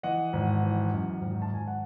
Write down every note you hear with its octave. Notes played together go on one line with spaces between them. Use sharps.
E3 D#5 F#5
G#1
E3
F#2
G#1
A5
G#1 G#5
F#5